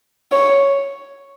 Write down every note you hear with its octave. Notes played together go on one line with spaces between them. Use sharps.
C#5